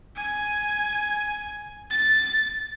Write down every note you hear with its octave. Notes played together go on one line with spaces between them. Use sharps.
G#5
A6